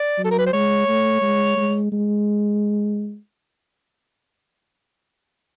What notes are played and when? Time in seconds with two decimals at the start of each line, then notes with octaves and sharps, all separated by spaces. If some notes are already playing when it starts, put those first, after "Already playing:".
Already playing: D5
0.18 F#3
0.24 A4
0.31 A#4
0.38 B4
0.46 C5
0.53 G#3 C#5
0.88 A3
1.22 G#3
1.57 G#3
1.92 G#3